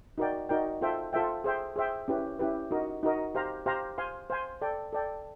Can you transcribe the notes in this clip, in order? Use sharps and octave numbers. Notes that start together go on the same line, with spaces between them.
D#4 F#4 A#4 D5 G5
D#4 F#4 A#4 D5 G5
F4 A4 C5 E5 G5
F4 A4 C5 E5 G5
G#4 C5 E5 G5
G#4 C5 E5 G5
C#4 E4 G4 B4
C#4 E4 G4 B4
D#4 F#4 A#4 D#5
D#4 F#4 A#4 D#5
G4 C5 F5 A#5
G4 C5 F5 A#5
C5 F5 G#5 C6
C5 F5 G#5 C6
A4 D5 G5
A4 D5 G5